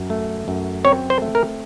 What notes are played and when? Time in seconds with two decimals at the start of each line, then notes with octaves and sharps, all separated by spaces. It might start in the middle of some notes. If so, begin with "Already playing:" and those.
Already playing: F#2
0.10 A3
0.48 F#2
0.85 C4 C#5
1.10 C5
1.22 A3
1.35 A#4